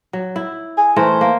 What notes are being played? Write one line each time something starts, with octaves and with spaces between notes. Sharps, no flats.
F#3
E4
G#4
E3 A3 A#4 C5
A#3